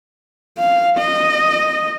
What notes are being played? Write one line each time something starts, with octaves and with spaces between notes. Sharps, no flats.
F5
D#5